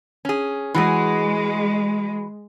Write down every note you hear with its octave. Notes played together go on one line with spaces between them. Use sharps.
C#4 G#4
E3 G#3 F#4 G#4